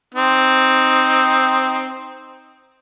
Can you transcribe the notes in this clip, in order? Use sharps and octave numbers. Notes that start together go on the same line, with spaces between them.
C4 D#4